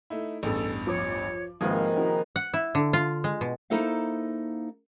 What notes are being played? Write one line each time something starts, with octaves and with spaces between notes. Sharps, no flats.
A3 D#4 E4
A1 E2 G2 A4
F3 C#5 D6
G#1 C3 D#3 F3 A#3 G#4 B4 F5
C#4 E4 F#4 A#5
F#5
E4
D3
F4
G#3
B2
A#3 D#4 E4 A4 C5 F5